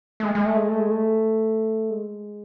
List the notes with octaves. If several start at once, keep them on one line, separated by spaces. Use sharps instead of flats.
A3
G#3
G#3
A3
G#3
A3
G#3
A3
G#3